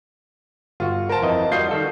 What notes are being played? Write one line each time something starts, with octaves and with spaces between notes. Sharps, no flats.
G1 F4 F#4
A#4 C5 A5
F2 E3 D#5
G3 F4 F#4 D#5 G6 C7
D#3 A4